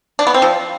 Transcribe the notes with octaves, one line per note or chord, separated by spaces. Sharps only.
D4
B3
C4
F3